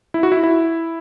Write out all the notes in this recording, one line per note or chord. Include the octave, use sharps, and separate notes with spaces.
E4
F#4
E4
E4